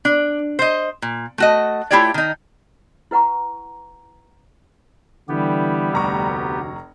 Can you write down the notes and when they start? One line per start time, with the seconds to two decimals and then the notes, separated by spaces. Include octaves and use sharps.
0.05 D4
0.59 C5 D#5
1.02 A#2
1.38 A3 F#4 D#5
1.91 A3 E4 F4 G4 C#5 D5
2.14 D#3 D#4
3.11 E4 B4 F#5 A#5 C#6
5.29 D3 E3 G3 B3 G4
5.93 F1 D2 A#5 C#6